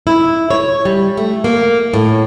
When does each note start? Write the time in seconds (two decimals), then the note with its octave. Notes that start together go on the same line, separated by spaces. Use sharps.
0.07 E4
0.50 C#5
0.85 G3
1.17 A3
1.44 A#3
1.93 A2